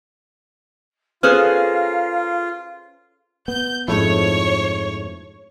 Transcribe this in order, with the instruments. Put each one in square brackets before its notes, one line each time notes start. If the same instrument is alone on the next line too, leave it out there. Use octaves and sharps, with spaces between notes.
[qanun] C#4 G#4 A4 [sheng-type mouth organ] F4 [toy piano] B4 C5 [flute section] F5 A#5
[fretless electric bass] B3 [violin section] G6
[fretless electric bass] F2 F3 [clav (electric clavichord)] G#2 A3 E4 [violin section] C#5